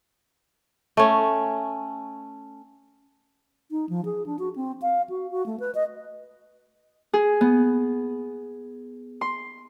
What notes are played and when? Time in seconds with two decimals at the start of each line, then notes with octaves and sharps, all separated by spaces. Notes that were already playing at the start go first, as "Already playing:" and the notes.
0.97 A3 C#4
3.71 D#4
3.89 F3
4.05 G#4
4.26 D4
4.39 F#4
4.56 C4
4.82 F5
5.10 F#4
5.31 F#4
5.46 A3
5.60 B4
5.75 D#5
7.13 G#4
7.41 B3
9.21 C6